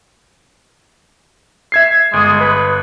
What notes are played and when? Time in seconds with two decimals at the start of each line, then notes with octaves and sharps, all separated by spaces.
1.72 E5 G#6 C7
2.13 G1 G#3 D#6
2.40 B4